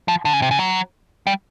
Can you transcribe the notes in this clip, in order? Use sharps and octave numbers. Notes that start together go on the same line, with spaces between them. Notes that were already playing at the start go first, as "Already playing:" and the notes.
F3
D3
C#3
C3
C#3
F#3
G3